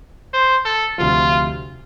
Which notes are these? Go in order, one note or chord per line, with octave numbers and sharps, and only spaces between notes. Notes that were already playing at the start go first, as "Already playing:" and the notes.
C5
A4
D2 C3 F3 F4